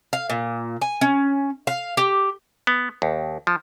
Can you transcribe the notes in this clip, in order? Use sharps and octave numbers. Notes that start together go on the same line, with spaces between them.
F5
A#2
G#5
C#4
F5
G4
B3
D#2
F3